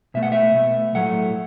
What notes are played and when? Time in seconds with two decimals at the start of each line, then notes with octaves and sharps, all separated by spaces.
0.14 B2 A3 E5
0.23 F#5
0.32 E5
0.54 B2 A3
0.95 A2 F#3 A3 F#5